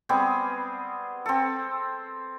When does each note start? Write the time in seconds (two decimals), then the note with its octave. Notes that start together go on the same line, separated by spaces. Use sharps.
0.09 G3 B3 C4 G#4
1.26 C4 A4